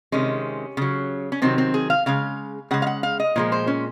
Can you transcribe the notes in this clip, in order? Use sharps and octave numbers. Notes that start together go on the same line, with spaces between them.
C3 D#3 G#3 C#4
C#3 F#3
C#4
C3 D#3 F#3 C4
C4
G#4
F5
C#3 G#3 F5
C#3 G#3 F#5
F5
F#5
F5
D#5
A#2 F3 G#3
C5
C#4